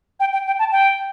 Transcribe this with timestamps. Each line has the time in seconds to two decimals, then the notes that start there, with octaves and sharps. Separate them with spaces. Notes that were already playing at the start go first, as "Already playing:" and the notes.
0.20 G5
0.33 G5
0.47 G5
0.59 A5
0.72 G5